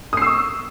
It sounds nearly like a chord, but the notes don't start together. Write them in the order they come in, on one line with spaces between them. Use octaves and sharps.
D#6 C7 E6 C#6